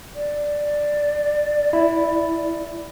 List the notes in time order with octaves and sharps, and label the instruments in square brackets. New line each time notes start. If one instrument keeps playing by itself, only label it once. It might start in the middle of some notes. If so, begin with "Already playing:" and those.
[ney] D5
[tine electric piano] E4